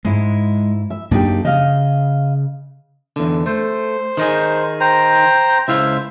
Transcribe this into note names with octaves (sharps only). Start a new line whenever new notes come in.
G#2 G#3 E4
E5
F#2 A#3 D4 D#4 G4
C#3 D#5 F5
E2 D3
A3 C5
D#3 D#4 G#4
C5 G5 A#5
C#2 E4 C5 E5 F5